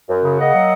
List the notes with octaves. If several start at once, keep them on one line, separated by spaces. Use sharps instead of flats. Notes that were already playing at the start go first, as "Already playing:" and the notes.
F#2
C#3
A#3 D#5 F#5
F#3